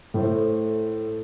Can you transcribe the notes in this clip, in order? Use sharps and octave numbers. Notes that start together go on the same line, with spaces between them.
A2 A3 E4 A4 C5